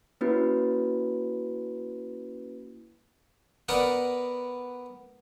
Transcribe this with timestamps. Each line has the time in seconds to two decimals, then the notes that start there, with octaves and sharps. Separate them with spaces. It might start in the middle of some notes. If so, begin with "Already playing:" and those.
0.21 A#3 C#4 E4 F#4 B4
3.68 B3 A#4 B4 D5 D#5 F#5